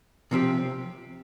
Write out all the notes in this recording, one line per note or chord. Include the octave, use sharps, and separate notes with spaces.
C3 F3 C4 G4